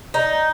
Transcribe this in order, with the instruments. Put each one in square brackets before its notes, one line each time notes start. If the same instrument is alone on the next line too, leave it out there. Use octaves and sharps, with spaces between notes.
[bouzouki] D#4